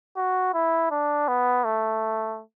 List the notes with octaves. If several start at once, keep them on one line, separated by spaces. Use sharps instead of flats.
F#4
E4
D4
B3
A3